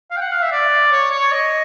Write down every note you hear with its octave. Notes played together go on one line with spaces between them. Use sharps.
F5
G5
F#5
F5
E5
D5
C#5
C#5
D#5